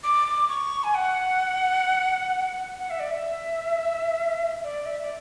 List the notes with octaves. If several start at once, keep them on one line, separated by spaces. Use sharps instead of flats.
D6
C#6
G#5
F#5
F#5
E5
D5
E5
D5
E5
D5